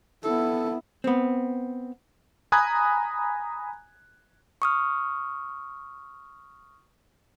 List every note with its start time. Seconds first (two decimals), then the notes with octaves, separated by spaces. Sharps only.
0.24 B3 E4 A4
1.04 B3 C4
2.52 G#5 A#5 B5 D#6 F#6 G#6
4.62 C#6 D#6 F6